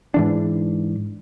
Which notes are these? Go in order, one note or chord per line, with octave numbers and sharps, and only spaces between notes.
G#2 E3 D4